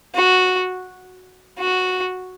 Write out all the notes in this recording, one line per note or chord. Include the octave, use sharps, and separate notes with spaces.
F#4
F#4